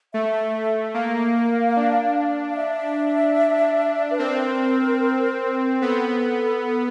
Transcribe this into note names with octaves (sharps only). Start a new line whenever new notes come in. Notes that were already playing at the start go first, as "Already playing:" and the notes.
A3 E5
A#3 F5
D4
F5
E5
B4
C4 A#4
B3 A4